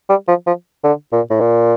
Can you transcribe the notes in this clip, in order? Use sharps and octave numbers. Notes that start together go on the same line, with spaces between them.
G3
F3
F3
D3
A#2
A2
A#2